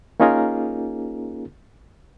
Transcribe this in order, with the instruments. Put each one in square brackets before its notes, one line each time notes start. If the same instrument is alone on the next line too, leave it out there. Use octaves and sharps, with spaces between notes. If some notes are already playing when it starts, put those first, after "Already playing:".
[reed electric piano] A#3 C#4 D#4 F4 G#4 A#4